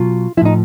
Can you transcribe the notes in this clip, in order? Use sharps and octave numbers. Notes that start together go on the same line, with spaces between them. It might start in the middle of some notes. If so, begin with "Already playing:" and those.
Already playing: B2 F#3 F4
A2 F3 D#4 E4